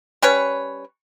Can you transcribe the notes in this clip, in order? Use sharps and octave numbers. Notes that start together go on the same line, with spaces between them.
G3 C#4 B4 C#5